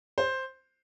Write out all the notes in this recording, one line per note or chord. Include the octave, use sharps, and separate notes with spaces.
C5